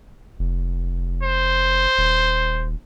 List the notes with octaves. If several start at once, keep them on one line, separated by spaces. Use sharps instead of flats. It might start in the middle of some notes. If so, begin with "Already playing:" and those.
F1
C5
D#1